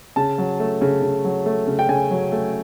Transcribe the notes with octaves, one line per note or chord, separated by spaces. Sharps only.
C#3 A5
F#3
A3
C#3
C#3
F#3
A3
C#3
G5
C#3 G#5
F#3
A3